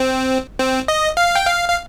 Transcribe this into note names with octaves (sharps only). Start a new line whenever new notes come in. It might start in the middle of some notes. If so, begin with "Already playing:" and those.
Already playing: C4
C4
D#5
F5
G5
F5
F5